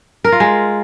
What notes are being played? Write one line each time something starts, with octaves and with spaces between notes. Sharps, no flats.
A#4
F4
G#3